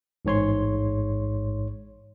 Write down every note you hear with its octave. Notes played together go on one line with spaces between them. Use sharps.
A1 G#2 C#5 C6